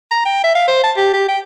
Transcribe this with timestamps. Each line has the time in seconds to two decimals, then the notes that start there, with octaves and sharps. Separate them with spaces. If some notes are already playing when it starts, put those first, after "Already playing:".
0.11 A#5
0.26 G5
0.44 E5
0.56 F5
0.68 C5
0.84 A5
0.97 G4
1.14 G4
1.29 G5